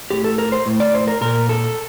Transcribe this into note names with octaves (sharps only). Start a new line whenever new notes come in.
A2 G4
A4
A#4
C5
A2
D5
C5
A#4
A#2 A#4
A4